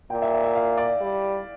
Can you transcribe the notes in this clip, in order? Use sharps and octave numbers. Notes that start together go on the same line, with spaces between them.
A#2 G5
E5
E5
E5
F5
D5
G3